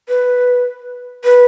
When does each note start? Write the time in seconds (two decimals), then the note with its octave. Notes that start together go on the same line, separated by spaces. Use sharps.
0.09 B4
1.24 B4